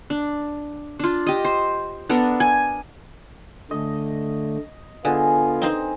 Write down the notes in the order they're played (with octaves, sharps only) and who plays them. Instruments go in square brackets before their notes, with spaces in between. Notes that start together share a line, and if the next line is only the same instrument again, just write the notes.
[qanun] D4
D4 F4
G4 D#5
C5
B3 D4 A4 A#4
G#5
[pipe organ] D3 A3 [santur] D#5
[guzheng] D3 [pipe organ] B3 F4 [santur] G#4 D#5
[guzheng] C4 D#4 C5